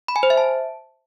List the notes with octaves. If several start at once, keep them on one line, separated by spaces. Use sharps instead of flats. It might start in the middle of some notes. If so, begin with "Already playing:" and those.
B5
G#5
C5
E5
A5